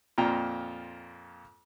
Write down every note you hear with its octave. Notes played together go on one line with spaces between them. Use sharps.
F2 A#2 F4 G5 A#5